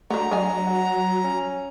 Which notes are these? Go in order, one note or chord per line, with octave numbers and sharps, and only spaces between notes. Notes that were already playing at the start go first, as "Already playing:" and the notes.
D3 F#3 A3 A#5
F#3 D4 D#5 G#5
F#4
C#4